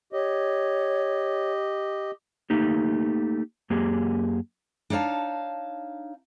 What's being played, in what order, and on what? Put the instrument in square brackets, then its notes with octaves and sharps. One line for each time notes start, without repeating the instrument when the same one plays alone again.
[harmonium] G4 D#5 [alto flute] C#5
[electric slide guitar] A3 A#3 D#4 G4
F#2 A#3 G4 G#4
[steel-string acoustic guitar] D4 D#4 C#5 F5 A5